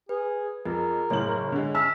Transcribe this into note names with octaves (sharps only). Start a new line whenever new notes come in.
G#4 B4
F2 G#4 A#4
F#1 A2 G#4 C#5 F#7
D3 G#3
C#4 E5 A5 F6